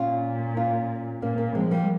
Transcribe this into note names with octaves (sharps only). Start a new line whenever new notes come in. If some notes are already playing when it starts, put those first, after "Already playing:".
Already playing: A#2 C#4 F4
C#4 F4
A#2 A#3 C#4
A#3 C#4
F3 G#3 C4
G3 A#3